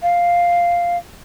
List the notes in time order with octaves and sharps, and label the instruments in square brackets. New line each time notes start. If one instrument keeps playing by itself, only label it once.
[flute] F5